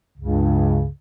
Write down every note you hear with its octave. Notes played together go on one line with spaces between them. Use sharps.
C#2 G2 C#3